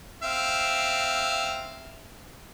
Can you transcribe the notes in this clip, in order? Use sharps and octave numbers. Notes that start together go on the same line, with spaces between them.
C4 E5 F5